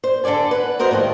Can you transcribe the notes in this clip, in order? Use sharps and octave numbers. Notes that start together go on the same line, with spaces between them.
C5
D3 A4 C#5 D5 G#5
B4 F#5
F#4 A#4 C5 D#5
A2 D#3 F3 G3